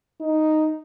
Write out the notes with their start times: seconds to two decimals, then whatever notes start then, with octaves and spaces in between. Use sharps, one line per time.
0.21 D#4